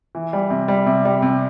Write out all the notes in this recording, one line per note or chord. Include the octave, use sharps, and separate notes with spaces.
E3
G3
C3
G3
C3
G3
C3